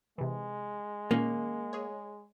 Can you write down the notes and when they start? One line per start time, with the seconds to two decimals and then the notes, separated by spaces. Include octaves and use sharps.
0.18 C3 E3 G#3
1.11 A#2 D#3 A#3 C#4
1.73 G#4 C#5